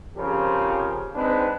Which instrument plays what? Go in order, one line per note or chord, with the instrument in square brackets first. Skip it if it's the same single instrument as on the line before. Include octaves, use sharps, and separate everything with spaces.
[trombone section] F2 C#3 F3 G4 A#4 C5
G#3 C4 D4 D#4 B4